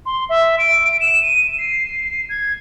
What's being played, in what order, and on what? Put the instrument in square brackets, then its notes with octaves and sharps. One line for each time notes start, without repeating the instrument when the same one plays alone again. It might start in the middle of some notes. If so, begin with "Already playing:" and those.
[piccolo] C6
E5
D7
D7
E7
D#7
C7
G#6